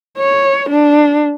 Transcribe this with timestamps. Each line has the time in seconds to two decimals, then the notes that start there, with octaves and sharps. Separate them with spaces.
0.19 C#5
0.70 D4